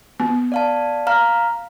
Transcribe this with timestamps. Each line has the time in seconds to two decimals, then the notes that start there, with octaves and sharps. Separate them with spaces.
0.20 B3
0.52 D5 F5 A5
1.07 F5 A#5 F6